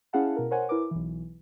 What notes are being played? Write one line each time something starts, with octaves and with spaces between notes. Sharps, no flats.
C#4 E4 G#4 F5 F#5 A5
B2 A#4
A#4 C5 C#5 F#5 G#5
E4 A#4 B4 D6
B1 E3